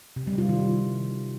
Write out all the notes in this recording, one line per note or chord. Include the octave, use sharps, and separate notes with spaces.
C3
G3
F4
D#3
E4